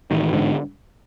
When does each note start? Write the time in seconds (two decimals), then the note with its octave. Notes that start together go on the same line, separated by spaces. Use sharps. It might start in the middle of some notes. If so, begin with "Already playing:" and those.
0.11 A1 D#3
0.33 G#2 D3